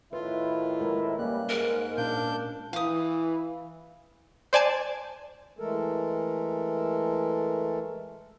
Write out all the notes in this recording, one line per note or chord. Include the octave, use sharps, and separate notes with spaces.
A2 D#3 E4 F4 B4
G#3 A#4
C#3 G3 A#3 F#6
G#2 A#4
A#2 C#4 D4 F5 G6
E3 F5 D#6
C5 D5 G#5 A5 G#6
E3 G#3 A3 A4 A#4